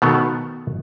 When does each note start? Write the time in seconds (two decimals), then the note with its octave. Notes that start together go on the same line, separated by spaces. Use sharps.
0.02 B2 D#3 A3 B3